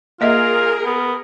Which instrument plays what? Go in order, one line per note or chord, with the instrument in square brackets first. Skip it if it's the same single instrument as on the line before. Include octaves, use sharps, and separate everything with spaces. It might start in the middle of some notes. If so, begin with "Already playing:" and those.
[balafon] A#3 D#5 E5 [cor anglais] F4 [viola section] G#4 A#4
[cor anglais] B3